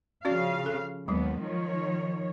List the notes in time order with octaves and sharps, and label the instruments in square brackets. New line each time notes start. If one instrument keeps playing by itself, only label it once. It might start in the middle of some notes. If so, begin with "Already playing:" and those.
[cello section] C#3 F3 F5 [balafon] C#4 F#4 D5
[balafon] A4
[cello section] D#2 B3 [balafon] F#3 G#3
[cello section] D#3 F3 C#5